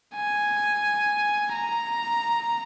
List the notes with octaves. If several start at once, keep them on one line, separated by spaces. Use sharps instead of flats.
G#5
A#5